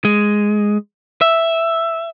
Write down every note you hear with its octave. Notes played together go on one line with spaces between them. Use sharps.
G#3
E5